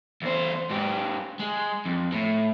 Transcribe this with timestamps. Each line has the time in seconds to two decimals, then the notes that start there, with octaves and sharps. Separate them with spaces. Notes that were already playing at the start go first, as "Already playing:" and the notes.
0.22 E2 C5
0.71 G#2 G4
1.40 G#3
1.86 F2
2.12 A2